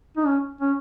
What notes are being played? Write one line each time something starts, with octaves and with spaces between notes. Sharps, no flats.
D#4
C#4
C#4